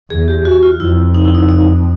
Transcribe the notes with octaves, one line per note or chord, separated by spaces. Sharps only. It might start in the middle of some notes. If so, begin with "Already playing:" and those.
E2 G#4
G4
F#4
F4
F2 E4
D#4
E4
D#4
D#4